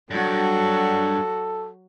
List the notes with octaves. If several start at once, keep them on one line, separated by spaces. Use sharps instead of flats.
G2 F#3 F#4 A4